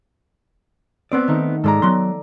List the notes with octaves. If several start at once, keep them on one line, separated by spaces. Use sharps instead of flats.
B3 C4 D5
D#3 A3 D#4
G#2 G#3 A4 D5 A#5
F#3 B3 C6